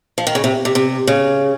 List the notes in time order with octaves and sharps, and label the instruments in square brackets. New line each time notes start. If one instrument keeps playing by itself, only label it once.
[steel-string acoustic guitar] F3
D#3
C#3
C3
C3
C3
C#3